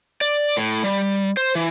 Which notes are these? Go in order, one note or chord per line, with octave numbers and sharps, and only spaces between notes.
D5
A2
G3
C5
E3